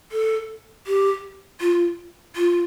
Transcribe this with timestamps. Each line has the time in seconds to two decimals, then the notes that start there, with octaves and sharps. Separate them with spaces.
0.12 A4
0.87 G4
1.61 F4
2.36 F4